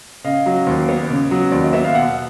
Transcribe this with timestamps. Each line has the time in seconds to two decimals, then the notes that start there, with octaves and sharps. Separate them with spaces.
0.24 C#3 D#5 F5
0.46 F#3
0.67 D#2
0.89 B3
1.10 C#3
1.31 F#3
1.51 D#2 D5
1.63 D#5
1.73 B3 E5
1.84 F5
1.95 B2 E5 F#5